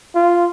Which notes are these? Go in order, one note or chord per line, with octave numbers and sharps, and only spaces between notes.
F4